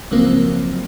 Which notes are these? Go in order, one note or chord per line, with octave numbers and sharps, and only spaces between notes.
C#2 F3 F#3 A#3 C4